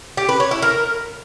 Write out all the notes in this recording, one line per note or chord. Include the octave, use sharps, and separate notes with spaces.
G4
B4
C#5
E4
A#4